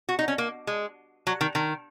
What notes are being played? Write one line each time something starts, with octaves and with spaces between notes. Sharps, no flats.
F#4
D#4
C#4
A#3
G#3
F#3
D#3
D#3